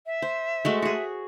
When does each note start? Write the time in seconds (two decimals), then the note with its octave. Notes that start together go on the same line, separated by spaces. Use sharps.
0.06 E5
0.22 C5
0.65 G#3 A3 F#4
0.82 F#4 G#4